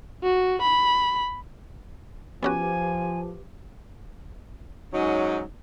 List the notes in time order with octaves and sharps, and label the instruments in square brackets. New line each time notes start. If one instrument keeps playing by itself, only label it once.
[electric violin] F#4
B5
[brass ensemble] F3 [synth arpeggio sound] B3 C#4 F#4 [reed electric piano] G4 B4 D6 [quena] G#5
[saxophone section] G#2 F#3 C#4 D#4